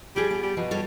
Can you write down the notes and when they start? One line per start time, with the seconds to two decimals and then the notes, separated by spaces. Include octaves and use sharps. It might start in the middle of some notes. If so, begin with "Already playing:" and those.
0.16 F3 G3 G#4
0.31 B3
0.43 G3
0.57 B2 F3
0.71 G3 A4 C#5